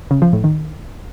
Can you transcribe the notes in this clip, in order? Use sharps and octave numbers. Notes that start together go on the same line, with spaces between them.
C#3
F3
A2
D#3